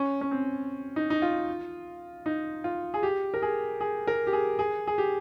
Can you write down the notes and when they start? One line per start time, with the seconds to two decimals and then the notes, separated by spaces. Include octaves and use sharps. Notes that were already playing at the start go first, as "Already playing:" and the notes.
Already playing: C#4
0.21 C#4
0.31 C4
0.96 D#4
1.10 D#4
1.22 F4
2.26 D#4
2.64 F4
2.94 G#4
3.03 G4
3.34 A#4
3.42 G#4
3.81 G#4
4.07 A#4
4.27 G4
4.33 G#4
4.59 G#4
4.87 G#4
4.98 G4